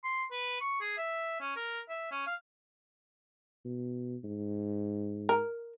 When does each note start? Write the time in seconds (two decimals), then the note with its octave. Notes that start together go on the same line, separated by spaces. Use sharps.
0.04 C6
0.32 B4
0.61 C#6
0.81 G#4
0.98 E5
1.41 C#4
1.56 A#4
1.89 E5
2.11 C#4
2.27 F5
3.65 B2
4.24 G#2
5.29 A#4